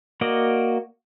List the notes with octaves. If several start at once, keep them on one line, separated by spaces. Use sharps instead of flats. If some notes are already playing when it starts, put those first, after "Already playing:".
A#3 F#4 D5 D#5